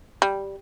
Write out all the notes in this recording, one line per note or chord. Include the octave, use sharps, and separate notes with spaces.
G3